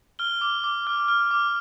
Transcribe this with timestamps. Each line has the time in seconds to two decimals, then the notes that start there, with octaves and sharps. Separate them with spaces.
0.19 F6 G7
0.41 D6
0.64 D6
0.87 F6
1.08 F6
1.31 D6